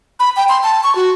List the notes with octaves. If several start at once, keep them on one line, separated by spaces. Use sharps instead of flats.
B5
G5
C6
A5
C#6
F#4